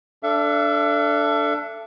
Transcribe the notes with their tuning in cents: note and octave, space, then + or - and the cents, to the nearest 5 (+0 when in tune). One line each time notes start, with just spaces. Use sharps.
D4 +0 A4 +0 E5 +40